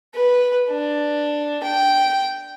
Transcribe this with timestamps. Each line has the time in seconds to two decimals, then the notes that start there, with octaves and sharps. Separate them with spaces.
0.15 B4
0.70 D4
1.63 G5